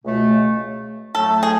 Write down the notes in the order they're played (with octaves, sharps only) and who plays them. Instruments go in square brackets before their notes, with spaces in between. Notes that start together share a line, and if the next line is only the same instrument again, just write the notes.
[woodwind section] C#2 B2 A3 C#4
[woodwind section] A2 F#3 A3 [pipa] A4
[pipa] G#4